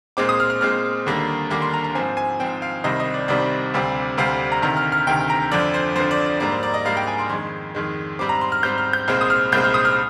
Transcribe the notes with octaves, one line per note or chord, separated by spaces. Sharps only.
A#2 G#3 C4 D6
D#6
F6
F6
A#2 G#3 C4 F6
D#2 D3 G3 A#3
D#2 D3 G3 A#3 D6
C6
A#5
A#5
G#2 F3 C4 G#5
G#5
G#2 F3 C4 G5
F5
C2 C3 D#3 G3 C4 D#5
D#5
D5
C2 C3 D#3 G3 C4 D5
D2 C3 G3 C4
D2 C3 G3 C4 F5
A#5
D2 C3 D#3 A#5
F6
F6
D2 C3 D#3 G5
A#5
F2 D3 F3 D5
C5
F2 D3 F3 C5
D5
D5
G#2 G3 A#3 D5
C5
D5
D#5
G#2 G3 A#3 F5
G5
G#5
C6
F2 D#3 G#3 C6
F2 D#3 G#3
G#2 G3 C4 D6
A#5
C6
F6
G#2 G3 C4 G6
F6
G6
C2 A#2 G#3 C4 F6
D#6
F6
C2 A#2 G#3 C4 G6
F6
D#6
F6